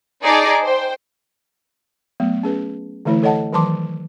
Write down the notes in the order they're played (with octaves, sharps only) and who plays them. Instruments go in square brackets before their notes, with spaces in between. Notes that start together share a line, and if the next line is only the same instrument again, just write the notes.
[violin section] D#4 G#4 D5 A5 D6
C5 G5
[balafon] F#3 A3 B3
C#4 G#4 B4
D3 E3 A3 E4 C#5
A4 C#5 D#5 F#5 A5
D#3 E3 F#3 A5 C6 D6